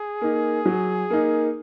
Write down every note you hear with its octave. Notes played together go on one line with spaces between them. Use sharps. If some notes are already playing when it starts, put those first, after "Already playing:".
Already playing: G#4
A#3 D#4
F#3
A#3 D#4